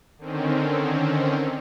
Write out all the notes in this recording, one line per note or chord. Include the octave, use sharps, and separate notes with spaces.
D3 D#3 C4 C#4